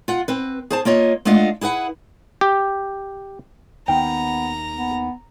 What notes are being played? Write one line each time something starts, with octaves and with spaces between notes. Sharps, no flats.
F4 F#5
C4 B4
G#4 C5 A5
A#3 F4 C#5 D#5
G#3 A3 D4 F4 D#5 F#5
E4 G#4 B4 F#5
G4
D#2 D#3 B3 G5 A#5
B3